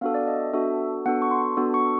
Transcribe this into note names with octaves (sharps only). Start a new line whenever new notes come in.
B3 D4 F#4 A4 F5
D5
D#5
E5
B3 D4 F#4 A4 E5
B3 D4 F#4 A4 F#5
C#6
C6
B3 D4 F#4 A4
C#6